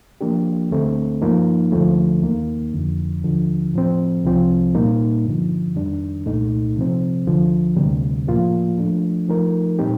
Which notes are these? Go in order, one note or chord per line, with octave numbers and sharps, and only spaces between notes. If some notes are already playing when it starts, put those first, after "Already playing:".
F3 A#3 D4 G4
D2 D3 A3 C4
G2 F3 A#3 D#4
D2 D3 F3 A3
D#2 D#3 A#3
F2 D3 F3
D#2 D3 F3
A2 F3 C4
C2 C3 F3 C4
A#2 G3 A#3 D#4
G2 D3 F3
F2 D#3 G3 D4
C2 A#2 A3 D#4
C3 F3 C4
D2 D3 F3
D2 C3 G3
A2 F3 A#3 F4
F3 A3 D4
F3 A3 D#4 A#4
A#2 G3 C4 D#4 G4